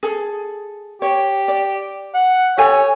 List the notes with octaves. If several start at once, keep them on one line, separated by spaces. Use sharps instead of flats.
G#4 A4
G4 C#5
D5
F#5
G4 A4 C#5 G#5